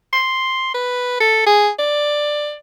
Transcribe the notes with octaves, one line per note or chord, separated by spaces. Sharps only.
C6
B4
A4
G#4
D5